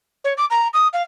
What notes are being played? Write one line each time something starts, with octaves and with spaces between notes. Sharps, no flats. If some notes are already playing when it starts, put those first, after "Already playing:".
C#5
D6
A#5
D#6
F5